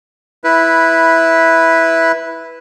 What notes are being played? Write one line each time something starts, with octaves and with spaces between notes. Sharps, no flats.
E4 B4